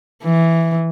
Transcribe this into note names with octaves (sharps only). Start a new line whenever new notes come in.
E3